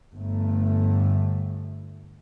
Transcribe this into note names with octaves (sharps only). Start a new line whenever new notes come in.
G1 A3